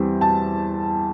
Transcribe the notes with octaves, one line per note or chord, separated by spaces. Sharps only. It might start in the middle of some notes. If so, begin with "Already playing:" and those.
Already playing: E2 E3 G3 C4
A5